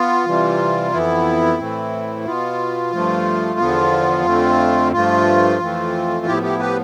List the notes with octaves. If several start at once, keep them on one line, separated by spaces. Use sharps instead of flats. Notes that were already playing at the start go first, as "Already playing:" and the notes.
Already playing: B3 F4
C3 E3 G3
F2 E3 B3 E4
A2 E3 A3 C4
B2 B3 F4
G2 F3 A3
E2 D3 F3 B3
F2 D3 A3 C4
G2 F3 A3 F4
F2 E3 A3 C4
A2 F3 B3 E4 G4
E4 G4
G4 B4